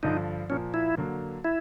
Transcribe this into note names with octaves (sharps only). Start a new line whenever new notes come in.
G2 D3 F3 D#4
A#2 F3 A#3 C#4
E4
D3 F#3 A#3
E4